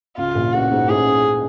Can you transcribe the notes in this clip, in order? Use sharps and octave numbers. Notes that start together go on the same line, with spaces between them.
C#2 C#3 F4
A#1 A#2
A1 A2 F#4
G#2
A1 A2 G#4